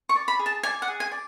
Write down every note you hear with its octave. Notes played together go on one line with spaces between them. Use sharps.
C#6
D5
B5
G#4
A5
D5 G#5
F#5
G#4
G#5
D5